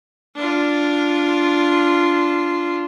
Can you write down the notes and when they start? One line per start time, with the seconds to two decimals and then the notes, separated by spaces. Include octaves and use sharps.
0.36 D4 F4